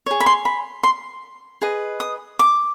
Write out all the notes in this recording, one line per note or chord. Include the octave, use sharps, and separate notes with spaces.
G#4 C#5
B5
C6
B5
C6
G#4 B4 D#5
D#6
D6